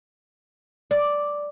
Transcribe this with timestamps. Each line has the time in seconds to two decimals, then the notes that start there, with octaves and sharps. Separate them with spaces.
0.91 D5